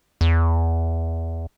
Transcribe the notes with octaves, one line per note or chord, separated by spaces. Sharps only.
E2